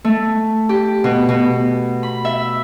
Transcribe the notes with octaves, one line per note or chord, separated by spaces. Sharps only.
A3
G4
B2
B2
B5
E5